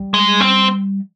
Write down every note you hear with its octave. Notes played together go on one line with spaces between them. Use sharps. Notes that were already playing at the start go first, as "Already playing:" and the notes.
Already playing: G3
G#3
C4